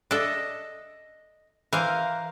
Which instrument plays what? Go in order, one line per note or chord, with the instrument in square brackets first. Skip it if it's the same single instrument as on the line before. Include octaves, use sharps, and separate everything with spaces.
[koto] D4 A4 [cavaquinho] D#5 E5
[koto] E3 [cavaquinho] A#4 C5 F5